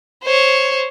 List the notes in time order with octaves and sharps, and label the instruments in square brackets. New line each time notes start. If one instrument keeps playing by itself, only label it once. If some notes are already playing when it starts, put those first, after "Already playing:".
[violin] C5 C#5